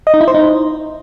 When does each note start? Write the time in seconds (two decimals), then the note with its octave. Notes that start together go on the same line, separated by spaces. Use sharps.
0.07 D#5
0.14 D#4
0.21 E4
0.28 C5
0.35 D#4